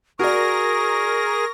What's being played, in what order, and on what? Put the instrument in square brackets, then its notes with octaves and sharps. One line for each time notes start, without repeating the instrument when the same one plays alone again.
[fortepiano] F#4 D5 [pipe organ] G#4 [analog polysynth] A#4 A#6 [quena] C#6